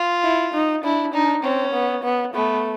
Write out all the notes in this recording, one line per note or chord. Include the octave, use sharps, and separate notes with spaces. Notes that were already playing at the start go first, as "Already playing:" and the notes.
Already playing: F4
E4
D#4
D4 E4
D4 D#4
C4 C#4
B3
B3
A3 B3